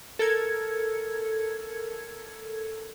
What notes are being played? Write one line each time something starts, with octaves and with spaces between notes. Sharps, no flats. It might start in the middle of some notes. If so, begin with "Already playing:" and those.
A4 A#4 G#6 C#7